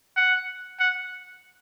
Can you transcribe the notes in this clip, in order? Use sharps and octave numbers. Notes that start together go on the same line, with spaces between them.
F#5
F#5